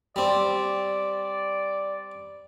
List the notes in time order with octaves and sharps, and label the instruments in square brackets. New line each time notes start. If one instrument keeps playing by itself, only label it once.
[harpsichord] G3 C4 [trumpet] D5